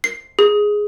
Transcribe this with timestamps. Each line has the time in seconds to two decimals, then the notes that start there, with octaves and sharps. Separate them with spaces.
0.04 C7
0.39 G#4